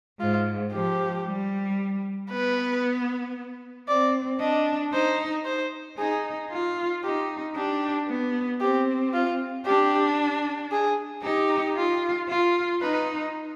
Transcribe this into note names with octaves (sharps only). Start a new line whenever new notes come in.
G#2 F4
F3 G4
G3
B3 B4
C4 D5
D4 D#5
D#4 C5
C5
D#4 G#4
F4
D#4 G4
D4 G4
B3
C4 G4
F4
D4 G4
G#4
D#4 G4
F4
F4
D#4 B4